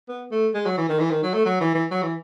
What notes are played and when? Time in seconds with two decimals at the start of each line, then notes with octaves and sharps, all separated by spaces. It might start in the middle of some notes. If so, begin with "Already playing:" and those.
0.09 B3
0.31 A3
0.55 G#3
0.66 F#3
0.78 E3
0.89 D#3
1.00 E3
1.11 D#3
1.23 F#3
1.34 A3
1.46 F#3
1.61 E3
1.75 E3
1.91 F#3
2.03 E3